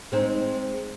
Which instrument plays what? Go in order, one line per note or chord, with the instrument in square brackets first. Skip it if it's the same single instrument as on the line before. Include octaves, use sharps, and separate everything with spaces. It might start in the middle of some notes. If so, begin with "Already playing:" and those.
[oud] G#3 C4 D#4